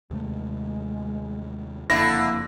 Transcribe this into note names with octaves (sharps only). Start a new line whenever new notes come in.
D#2 C3 G#3 A3
F#1 F2 D3 A#3 E4 A#6